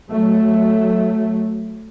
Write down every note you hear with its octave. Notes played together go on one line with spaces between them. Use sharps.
F#3 A3